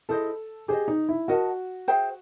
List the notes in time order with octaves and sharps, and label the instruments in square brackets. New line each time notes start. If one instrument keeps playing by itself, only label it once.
[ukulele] E4 G#4 C5 D#5 [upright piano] A4
[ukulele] G4 C5 D#5 [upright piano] G#4
[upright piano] D#4
E4
[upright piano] F#4 [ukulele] A#4 D#5 F#5 A5
[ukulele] G#4 C5 E5 G5